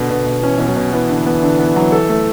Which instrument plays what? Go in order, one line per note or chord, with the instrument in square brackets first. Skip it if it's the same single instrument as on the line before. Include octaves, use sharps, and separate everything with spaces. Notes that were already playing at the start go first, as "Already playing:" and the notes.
Already playing: [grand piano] B2 [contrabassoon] D3
[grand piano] B2
B2
[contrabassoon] E3 [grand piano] C#4
[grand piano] B2 [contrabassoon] E3
[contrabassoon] F#3
[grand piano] B2
[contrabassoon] E3 [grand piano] B3
[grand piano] D3
B3
D3
B3
F#3
A4
A3